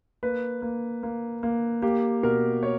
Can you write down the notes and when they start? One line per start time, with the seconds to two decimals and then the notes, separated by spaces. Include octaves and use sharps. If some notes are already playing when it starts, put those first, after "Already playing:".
0.23 A#3 B4
0.62 A#3
1.03 A#3
1.43 A#3
1.82 A#3 G4
2.23 B2 A#4
2.63 C#5